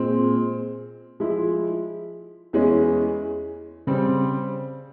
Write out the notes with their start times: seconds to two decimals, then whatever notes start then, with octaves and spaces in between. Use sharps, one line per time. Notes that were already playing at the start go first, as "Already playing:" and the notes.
Already playing: A#2 G#3 C4
1.20 F3 G#3 E4
2.53 E2 E3 G#3 C#4
3.87 C#3 G3 C4